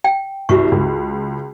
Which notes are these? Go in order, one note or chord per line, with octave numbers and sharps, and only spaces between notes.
G5
C2 F#4 C#6
C#2